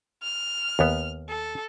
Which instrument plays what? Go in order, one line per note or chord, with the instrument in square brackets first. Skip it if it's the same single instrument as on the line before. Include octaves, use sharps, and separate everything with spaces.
[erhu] F6
[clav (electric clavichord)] D#2 B3
[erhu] A4